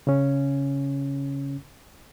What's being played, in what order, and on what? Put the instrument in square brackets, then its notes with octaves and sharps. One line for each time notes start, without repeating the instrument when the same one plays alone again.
[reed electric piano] C#3 C#4